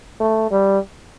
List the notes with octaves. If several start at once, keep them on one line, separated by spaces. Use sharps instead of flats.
A3
G3